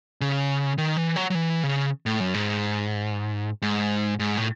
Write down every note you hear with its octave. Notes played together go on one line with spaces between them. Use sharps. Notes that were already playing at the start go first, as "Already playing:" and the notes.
C#3
D#3
E3
F#3
F#3
E3
C#3
A2
F#2
G#2
G#2
G#2
A2